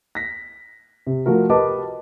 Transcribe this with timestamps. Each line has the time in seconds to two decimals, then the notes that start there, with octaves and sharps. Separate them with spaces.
0.15 A#6 B6
1.07 C3
1.26 F3 A3 F#4 A#4
1.50 G4 A#4 B4 D#5 A5 D6